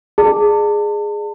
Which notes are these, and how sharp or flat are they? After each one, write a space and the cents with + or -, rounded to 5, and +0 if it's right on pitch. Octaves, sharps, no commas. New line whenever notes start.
G#4 +0 D5 +40 A5 +35